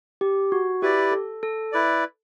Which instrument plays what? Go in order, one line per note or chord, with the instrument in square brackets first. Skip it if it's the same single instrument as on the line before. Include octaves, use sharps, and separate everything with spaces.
[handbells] G4
F#4
[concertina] E4 B4 D5 [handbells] G4
[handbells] A4
A4
[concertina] E4 B4 D5